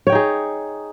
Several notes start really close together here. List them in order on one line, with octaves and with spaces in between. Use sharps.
C#5 G5 D#4 G#4